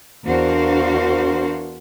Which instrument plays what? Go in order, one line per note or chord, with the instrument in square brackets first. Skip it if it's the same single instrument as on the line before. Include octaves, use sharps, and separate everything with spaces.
[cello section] E2 D4 F#4 A#4 C5 F5